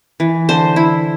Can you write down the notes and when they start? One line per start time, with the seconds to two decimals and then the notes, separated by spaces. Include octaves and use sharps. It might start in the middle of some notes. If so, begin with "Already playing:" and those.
0.20 E3
0.49 D3 C5
0.76 E4